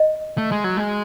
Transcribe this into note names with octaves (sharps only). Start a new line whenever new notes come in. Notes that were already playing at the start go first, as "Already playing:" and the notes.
Already playing: D#5
A3
G#3
F#3
G#3